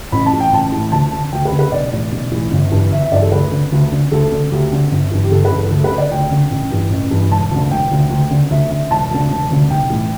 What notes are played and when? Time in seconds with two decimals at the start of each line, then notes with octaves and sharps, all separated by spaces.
0.12 A1 B5
0.26 A5
0.32 A2 E3
0.40 G5
0.52 A1 A5
0.72 A2 E3
0.92 D2 A5
1.12 D3
1.32 D2 G5
1.45 B4
1.52 D3
1.59 B4
1.72 B1 D5
1.91 A2 E3
2.12 B1
2.32 A2 E3
2.51 G1
2.71 G2 E3
2.91 G1 E5
3.02 E5
3.11 G2 D5
3.14 E3
3.22 A4
3.32 D2 B4
3.52 D3
3.72 D2
3.92 D3
4.12 D2 A4
4.31 D3
4.51 D2 G4
4.72 D3
4.91 G1
5.11 G2 E3
5.23 G4
5.31 G1 A4
5.45 B4
5.52 G2 E3
5.58 A4
5.71 D2 A4
5.84 B4
5.91 D3
5.98 D5
6.11 D2 G5
6.31 D3
6.51 A1
6.71 G2 E3
6.91 A1
7.11 G2 E3
7.31 E1 A5
7.51 D2 D3
7.71 E1 G5
7.91 D2 D3
8.10 D2
8.31 D3
8.50 D2 E5
8.70 D3 E5
8.91 E1 A5
9.11 D2 D3
9.30 E1
9.50 D2 D3
9.70 B1 G5
9.90 A2 E3